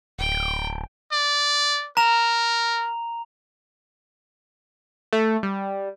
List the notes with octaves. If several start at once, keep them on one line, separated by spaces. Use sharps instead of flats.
D1 G5
D5
A#4 A#5 F7
A3
G3